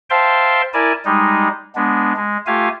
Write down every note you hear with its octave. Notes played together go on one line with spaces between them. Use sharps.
C5 E5 F5 G5 A5 C6
E4 A#4 D5 G#5 A5
G3 G#3 D#4
G#3 B3 D4
G#3
A3 F4 G4 F5 G#5